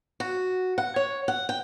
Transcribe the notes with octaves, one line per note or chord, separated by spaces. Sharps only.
F#4
F#5
C#5
F#5
G5